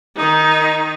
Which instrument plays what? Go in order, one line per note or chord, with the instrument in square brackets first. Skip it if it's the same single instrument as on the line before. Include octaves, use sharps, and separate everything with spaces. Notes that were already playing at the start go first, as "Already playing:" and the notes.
[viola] D#3 D#4